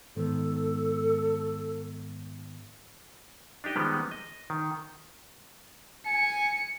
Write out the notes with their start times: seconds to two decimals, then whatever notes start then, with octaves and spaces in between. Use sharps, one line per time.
0.16 G#2 D#3 B3 A4
3.64 D4 D#4 G4 D#5
3.76 D#3 F3 G3 G#3 B3
4.11 D#5
4.50 D#3
6.06 G#5 C#7